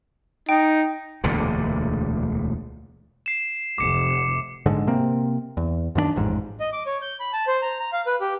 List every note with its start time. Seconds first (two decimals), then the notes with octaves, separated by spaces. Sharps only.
0.49 D#4 G5
1.24 E1 D2 A#2 D3
3.26 C7 E7
3.78 F1 D6 C#7
4.66 A#1 G#2 D3 G#3
4.87 C3 A#3 C4
5.57 E2
5.95 F#2 D#3 B3 D4
6.16 A1 F2 G#2
6.60 D#5
6.73 D6
6.86 C#5
7.02 G6
7.20 B5
7.33 A5
7.47 C5
7.62 A#5
7.80 A#5
7.93 F5
8.07 B4
8.21 G4